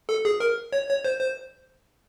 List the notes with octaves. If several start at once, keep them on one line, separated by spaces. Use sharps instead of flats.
A4
G#4
A#4
C#5
C#5
C5
C5